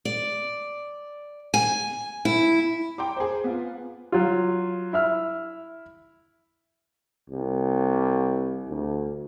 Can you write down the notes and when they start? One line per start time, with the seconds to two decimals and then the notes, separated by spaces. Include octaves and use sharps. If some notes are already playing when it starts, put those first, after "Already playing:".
0.05 D5
1.54 G#5
2.25 E4
2.98 G5 A#5 C6 D6
3.17 G#4 C5
3.44 B3 F4
4.12 F#3 F4
4.93 E4 E5 F6
7.30 C2
8.68 D2